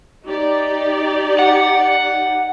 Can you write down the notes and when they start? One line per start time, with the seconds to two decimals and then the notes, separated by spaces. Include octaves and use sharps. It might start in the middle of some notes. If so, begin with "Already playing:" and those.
0.25 D#4 G4 D5
1.39 F#5